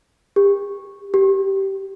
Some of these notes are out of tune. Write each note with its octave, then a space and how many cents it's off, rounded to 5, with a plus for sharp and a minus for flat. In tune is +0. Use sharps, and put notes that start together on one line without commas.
G4 +35
G4 -15